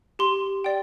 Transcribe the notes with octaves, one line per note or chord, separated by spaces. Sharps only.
G4 C6
D5 G5